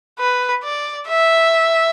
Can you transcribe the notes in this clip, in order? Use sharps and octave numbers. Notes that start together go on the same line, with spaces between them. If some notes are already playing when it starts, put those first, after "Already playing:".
B4
D5
E5